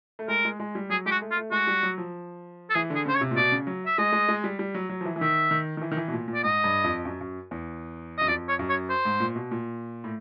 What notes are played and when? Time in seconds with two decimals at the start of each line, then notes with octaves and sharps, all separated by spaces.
0.19 A3
0.28 G#3 A#4
0.45 G#3
0.60 G#3
0.75 G3
0.90 F#3 G#4
1.06 G#3 G4
1.11 F#4
1.21 A3
1.31 F4
1.36 A3
1.52 G#3 F#4
1.67 G3
1.83 F#3
1.98 F3
2.70 A4
2.75 E3 G#4
2.90 D3 G#4
3.06 C#3 C5
3.16 C#5
3.21 C3
3.31 A#2
3.36 B2 D5
3.52 C#3
3.67 F#3
3.86 E5
3.98 G#3 D#5
4.12 G#3
4.29 G#3
4.44 G3
4.59 G3
4.74 F#3
4.89 F#3
5.01 F3
5.06 E3
5.16 E3
5.21 D#3 E5
5.51 D#3
5.77 D#3
5.82 E3
5.91 D#3
5.97 E3
6.08 B2
6.13 A#2
6.28 A#2
6.34 D5
6.43 G#2 D#5
6.64 G2
6.84 F2
7.05 F#2
7.21 F#2
7.51 E2
8.18 F#2 D#5
8.28 F2 D5
8.48 C#5
8.59 F#2
8.69 C#5
8.90 C5
9.05 G#2
9.20 A#2
9.36 B2
9.51 A#2
10.04 A2